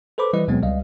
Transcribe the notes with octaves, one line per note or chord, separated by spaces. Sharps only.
A4 B4 C5 B5 D6
E3 G3 E4 B4 D#5
D#2 B2 F#3 G#3 B3 C4
C#2 G3 D#5 F5